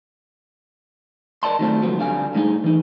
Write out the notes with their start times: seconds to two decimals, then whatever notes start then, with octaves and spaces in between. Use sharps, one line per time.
1.43 A#4 D5 D#5 A5 C6
1.59 D#3 F#3 A3 C4 F4 A4
1.82 C#2 F3 F#3 B3 C4
1.99 D3 G3 F5 G#5
2.35 A2 G3 D#4 G#4
2.64 E3 D#4